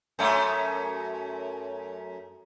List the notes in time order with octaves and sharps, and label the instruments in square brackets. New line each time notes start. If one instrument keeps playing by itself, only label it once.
[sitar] F#2 A3 C#4